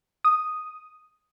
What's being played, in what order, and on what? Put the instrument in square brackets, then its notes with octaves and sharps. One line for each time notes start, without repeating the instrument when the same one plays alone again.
[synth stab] D#6